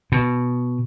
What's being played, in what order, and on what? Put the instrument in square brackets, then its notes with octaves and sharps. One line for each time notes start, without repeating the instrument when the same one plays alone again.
[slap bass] B2